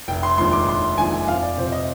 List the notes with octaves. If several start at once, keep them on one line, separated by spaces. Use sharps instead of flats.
F1 G5
C6
D#2 D3 F3 G#3 C6
D6
F1 C6
D#2 D3 F3 G#3 G#5
G#5
F2 F5
D5
C3 F3 C5
D#5